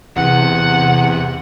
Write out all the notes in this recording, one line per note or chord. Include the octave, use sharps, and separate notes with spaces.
E2 C3 F#5